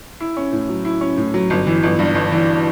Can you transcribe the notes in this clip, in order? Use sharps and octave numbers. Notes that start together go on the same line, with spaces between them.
E4
C#4
A2
F#3
E4
C#4
A2
F#3
G1
E3
G1
G2
G1
E3